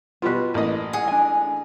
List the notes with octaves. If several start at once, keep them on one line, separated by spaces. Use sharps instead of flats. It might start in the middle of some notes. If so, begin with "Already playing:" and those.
B2 G3 B3 F4 B4
A1 A#3 D#5
G#4 F#5
D4 G#5